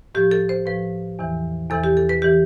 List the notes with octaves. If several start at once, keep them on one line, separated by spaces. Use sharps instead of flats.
A2 F3 G4
A4
C5
A2 F3 B4
E2 C3 E3
E2 C3 E3 A4
G4
A4
B4
E3 G4